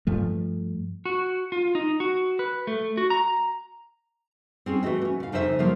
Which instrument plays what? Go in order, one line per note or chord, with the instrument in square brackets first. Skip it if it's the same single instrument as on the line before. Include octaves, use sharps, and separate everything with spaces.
[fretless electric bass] G2 F3 A3
[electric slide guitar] F#4
F4
D#4
F#4
B4
A3
F#4
A#5
[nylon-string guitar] C4 C#4 G#4
E3 A3 F#4 D#5 E5
C#4 F#4
C#3 F5
F2 C#3 D#4 C5 E5
F3 F#3 A#3